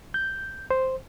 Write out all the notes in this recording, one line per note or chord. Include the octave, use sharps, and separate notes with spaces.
G6
C5